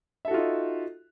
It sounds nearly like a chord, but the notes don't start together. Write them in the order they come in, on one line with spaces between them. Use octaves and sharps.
E5 A4 F#4 F4 D#4